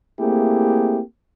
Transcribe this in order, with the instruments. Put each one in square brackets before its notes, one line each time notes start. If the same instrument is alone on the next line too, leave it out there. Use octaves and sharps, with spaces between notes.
[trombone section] A3 A#3 C4 E4 G4 G#4